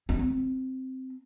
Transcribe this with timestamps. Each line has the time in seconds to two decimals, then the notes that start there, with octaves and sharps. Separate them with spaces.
0.09 C#4
0.19 C4